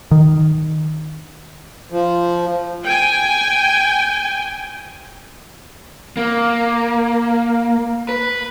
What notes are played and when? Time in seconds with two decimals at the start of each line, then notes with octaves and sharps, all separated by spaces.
0.11 D#3
1.91 F3
2.85 G5 G#5
6.17 A#3
8.09 B4